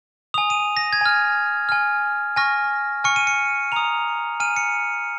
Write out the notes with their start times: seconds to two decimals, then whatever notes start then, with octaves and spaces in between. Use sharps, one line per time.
0.34 D#6 F7
0.38 G#5
0.50 D#7
0.77 A#6
0.93 G#6
1.01 G#5 F6
1.69 G#5 F6
2.36 G#5 C#6 F6 A#6
3.04 G#5 C#6 F6 C#7
3.16 D#7
3.27 C#7
3.72 A#5 D#6 F7
4.40 G#5 F6 D#7
4.56 C#7